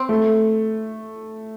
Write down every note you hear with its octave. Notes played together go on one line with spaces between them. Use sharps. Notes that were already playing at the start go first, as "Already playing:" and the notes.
Already playing: C4
A3